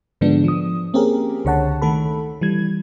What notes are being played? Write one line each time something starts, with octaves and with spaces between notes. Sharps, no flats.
G#2 D3 F3 G#3 B3 D4
F3 D#6
A#3 C4 C#4 G4 G#4 A#4
C#2 D3 C#5 F#5 A5
D#3 A3 A4 B5
E3 G3 G#6